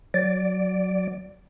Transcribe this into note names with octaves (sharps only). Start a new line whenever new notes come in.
F#3 D5